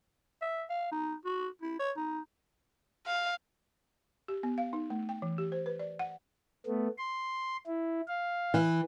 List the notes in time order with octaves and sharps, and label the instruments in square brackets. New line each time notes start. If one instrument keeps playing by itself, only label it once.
[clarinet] E5
F5
D#4
F#4
E4
C#5
D#4
[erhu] F5
[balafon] G4
B3
F5
D#4
A3
G5
E3
G4
C5
B4
D5
F#5
[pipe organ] A3 B3
C6
E4
F5
[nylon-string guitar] E3